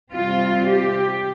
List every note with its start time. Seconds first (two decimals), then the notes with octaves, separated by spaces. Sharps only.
0.13 C3 G3 C4 F4
0.68 G4